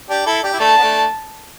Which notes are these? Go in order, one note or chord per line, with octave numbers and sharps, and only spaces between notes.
D4 G4
E4 A4
D4 G4
E4
A3 D4 A5
B3
A3 D4